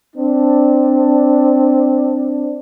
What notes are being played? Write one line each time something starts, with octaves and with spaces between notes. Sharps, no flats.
C4 D4